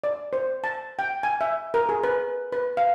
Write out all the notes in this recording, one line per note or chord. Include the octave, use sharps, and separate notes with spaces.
D5
C5
A5
G5
G#5
E5
A#4
G#4
B4
B4
F5